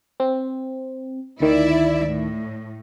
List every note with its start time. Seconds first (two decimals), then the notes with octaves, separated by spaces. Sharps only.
0.20 C4
1.40 D2 D#3 E4 D5 E5
2.06 A2